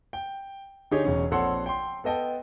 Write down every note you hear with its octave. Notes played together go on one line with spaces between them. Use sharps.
G5
D3 D#4 G4 G#4 C#5
E1 E2 C#4
A#1 C4 A4 C#5 F#5 C6
G5 C6
B3 A4 D#5 G5 A5